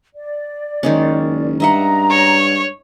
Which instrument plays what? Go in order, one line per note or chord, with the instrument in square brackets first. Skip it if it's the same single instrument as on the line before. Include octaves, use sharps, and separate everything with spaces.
[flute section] D5
[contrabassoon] F#1 [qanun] D#3 G#3 C#4
[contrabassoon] G2 [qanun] D#5 E5 F#5 [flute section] A#5
[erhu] C#5